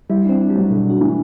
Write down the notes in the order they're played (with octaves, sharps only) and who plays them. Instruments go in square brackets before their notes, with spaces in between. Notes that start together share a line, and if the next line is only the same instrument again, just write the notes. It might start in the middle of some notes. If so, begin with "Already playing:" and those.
[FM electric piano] G3 [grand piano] E4
[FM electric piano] C4 [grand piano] D4
[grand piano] D4
[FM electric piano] G3
[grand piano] F#3
[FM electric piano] B2 [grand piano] D3
[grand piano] D3 [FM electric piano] F#4
[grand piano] E3